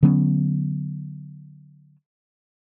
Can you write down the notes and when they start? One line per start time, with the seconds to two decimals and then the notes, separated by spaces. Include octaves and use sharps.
0.03 D3 F#3 B3 C#4